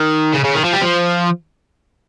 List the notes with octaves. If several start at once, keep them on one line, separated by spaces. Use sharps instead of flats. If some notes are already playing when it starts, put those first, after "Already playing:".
Already playing: D#3
C#3
C#3
D#3
F3
G3
F3